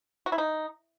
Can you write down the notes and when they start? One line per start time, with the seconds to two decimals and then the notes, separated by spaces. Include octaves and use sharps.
0.26 F#4
0.32 E4
0.38 D#4